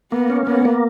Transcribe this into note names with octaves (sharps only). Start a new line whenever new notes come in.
A#3 B3
C#4
A#3 B3
A#3